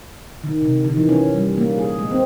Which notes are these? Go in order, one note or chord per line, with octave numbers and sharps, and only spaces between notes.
D#3
C3
D#3
E3
C#4
G3
A#3
G#4
G#3
C4